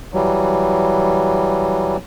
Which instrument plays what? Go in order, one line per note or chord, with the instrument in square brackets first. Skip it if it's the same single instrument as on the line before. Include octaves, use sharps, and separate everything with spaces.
[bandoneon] E3 F#3 G3